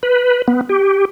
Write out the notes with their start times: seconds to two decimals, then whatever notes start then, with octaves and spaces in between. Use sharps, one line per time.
0.03 B4
0.48 B3
0.69 G4